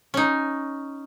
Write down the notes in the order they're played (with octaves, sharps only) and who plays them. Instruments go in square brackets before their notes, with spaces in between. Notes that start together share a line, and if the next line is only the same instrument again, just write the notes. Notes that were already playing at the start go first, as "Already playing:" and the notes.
[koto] C#4 D#4